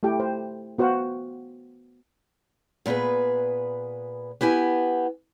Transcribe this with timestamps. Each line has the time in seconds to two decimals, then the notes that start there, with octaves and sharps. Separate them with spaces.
0.03 A3 E4 G4 G5
0.20 C5
0.78 B3 F#4 C5 F5 F#5
2.86 A#2 B3 G4 G#4 B4
4.41 B3 E4 G4 G#5